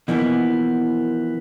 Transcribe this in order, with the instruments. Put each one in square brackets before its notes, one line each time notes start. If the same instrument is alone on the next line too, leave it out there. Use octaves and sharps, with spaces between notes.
[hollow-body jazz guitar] B2 E3 F3 A#3 B3